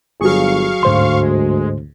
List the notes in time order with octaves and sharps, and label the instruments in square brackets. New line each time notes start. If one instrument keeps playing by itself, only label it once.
[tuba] G1 [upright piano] F#3 G#4 [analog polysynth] F5 C#6
[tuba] D2 [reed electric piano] G#2 C5 C6
[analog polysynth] G#3